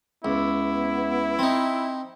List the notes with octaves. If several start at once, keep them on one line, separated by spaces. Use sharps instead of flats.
C#2 B3 E4
C4 D#4